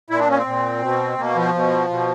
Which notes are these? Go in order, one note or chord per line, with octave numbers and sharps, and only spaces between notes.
A#2 E4
D4
C#4
C4
A#2
B2
B2 A#3
F3
B2
B2